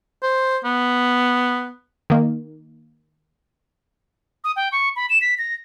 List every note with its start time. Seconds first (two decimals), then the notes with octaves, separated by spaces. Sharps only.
0.23 C5
0.65 B3
2.10 D#3 A#3
4.44 D#6
4.56 G5
4.72 C#6
4.96 B5
5.10 E7
5.21 B6
5.38 A#6